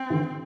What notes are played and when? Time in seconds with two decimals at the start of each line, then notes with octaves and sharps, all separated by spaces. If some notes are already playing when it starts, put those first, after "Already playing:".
Already playing: C4
0.10 D3 E3